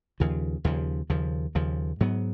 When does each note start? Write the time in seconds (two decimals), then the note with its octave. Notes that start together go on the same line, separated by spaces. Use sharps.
0.20 D#2 C#3 F3
0.64 D#2 C#3 F3
1.10 D#2 C#3 F3
1.55 D#2 C#3 F3
2.00 G#2 F#3 B3